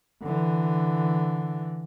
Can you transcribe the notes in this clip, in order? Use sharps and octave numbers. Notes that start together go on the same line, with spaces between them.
D3 E3